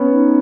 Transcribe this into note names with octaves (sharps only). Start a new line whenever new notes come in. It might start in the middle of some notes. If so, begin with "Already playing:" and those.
Already playing: B3 C#4
D#4